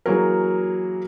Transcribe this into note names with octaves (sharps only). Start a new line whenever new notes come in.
E3 F#3 A#3 F#4 G#4 A#4